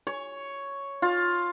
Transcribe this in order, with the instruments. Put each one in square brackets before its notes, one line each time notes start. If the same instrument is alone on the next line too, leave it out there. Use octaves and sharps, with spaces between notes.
[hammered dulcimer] C#5
F4